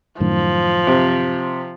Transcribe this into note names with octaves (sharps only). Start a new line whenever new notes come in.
F#2 A2 D#3 F3
C3